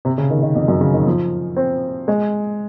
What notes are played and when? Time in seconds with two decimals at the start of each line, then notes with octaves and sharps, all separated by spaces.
0.05 C3
0.18 C#3
0.30 D#3
0.42 D#3
0.56 F2
0.68 F#2
0.81 C#3
0.94 D#3
1.06 F3
1.56 C4
2.08 G#3